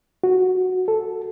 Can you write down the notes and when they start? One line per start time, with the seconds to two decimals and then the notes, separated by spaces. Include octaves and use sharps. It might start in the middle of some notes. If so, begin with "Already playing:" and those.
0.24 F#4
0.88 A4